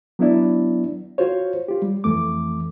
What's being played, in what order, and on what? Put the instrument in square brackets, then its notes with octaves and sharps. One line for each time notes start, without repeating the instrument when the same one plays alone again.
[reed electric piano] F#3 B3 D4 E4 D5
F4 F#4 C5 C#5
F4 G4
G3
F2 E3 A3 D6